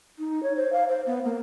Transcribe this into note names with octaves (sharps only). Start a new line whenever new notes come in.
D#4
C#5
C5
F5
C5
B3
A#3